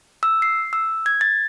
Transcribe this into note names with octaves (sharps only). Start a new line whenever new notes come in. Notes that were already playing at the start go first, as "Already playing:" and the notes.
E6
C7
E6
G#6
A6